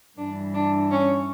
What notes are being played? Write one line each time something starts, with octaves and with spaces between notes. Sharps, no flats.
G2 E3 D4
D4
C#4